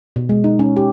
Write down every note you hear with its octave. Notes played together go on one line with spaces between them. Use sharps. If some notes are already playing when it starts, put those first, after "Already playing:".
B2
G#3
D#4
C#4
G4